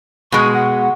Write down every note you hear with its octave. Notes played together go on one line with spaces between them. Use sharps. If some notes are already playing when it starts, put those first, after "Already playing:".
B2 G#3 C#6
F#5